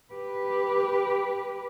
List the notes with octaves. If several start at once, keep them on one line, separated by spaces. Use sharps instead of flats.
G4 B4